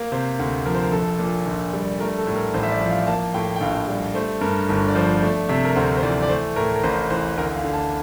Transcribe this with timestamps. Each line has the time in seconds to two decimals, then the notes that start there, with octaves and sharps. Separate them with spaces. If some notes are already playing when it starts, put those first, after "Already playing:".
Already playing: A#3
0.12 C3 C5
0.39 D2
0.66 F3 A#4
0.74 C5
0.83 A#4
0.92 A#1 A4
1.19 A#2
1.46 A#1
1.73 G3
2.00 A3 A#4
2.18 A4
2.27 A2
2.36 A#4
2.54 A1 C5
2.63 E5
2.71 D5
2.81 F3
2.90 F5
3.07 A#3 A5
3.34 A2 G5
3.56 G5
3.61 A#1 F5
3.88 G3
4.15 A3 C5
4.41 G2 A#4
4.69 G1 A#4
4.88 D5
4.95 F3 C5
5.22 A3 D5
5.49 C3 E5
5.65 A#4
5.76 D2 C5
5.97 C5
6.02 E3 D5
6.22 D5
6.29 A3 C5
6.56 A2 A#4
6.76 A#4
6.83 A1 C5
7.10 E3 C5
7.37 D2 A#4
7.55 F5
7.64 D3
7.73 A5